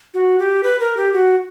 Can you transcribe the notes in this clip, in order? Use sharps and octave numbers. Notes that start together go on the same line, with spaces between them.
F#4
G4
B4
A#4
G4
F#4